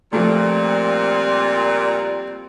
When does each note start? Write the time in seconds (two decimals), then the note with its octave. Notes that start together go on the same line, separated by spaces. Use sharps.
0.13 A#2 F3 G3 A3 C4